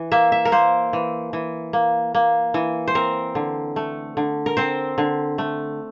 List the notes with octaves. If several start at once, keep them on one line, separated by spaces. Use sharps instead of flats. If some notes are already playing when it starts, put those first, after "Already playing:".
Already playing: E3
A#3 E5
E5
A#4
A#3 C5
E3
E3
A#3
A#3
E3
C5
C4 A#4
D3
A3
D3
A#4
C4 C5
D3
A3